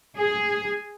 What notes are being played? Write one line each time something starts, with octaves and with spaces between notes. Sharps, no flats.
G#4